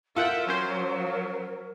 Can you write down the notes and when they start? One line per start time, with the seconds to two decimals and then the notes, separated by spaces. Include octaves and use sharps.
0.16 F4 A4 A#4 E5 F#5 G5
0.48 F#3 C#4 A#4 C5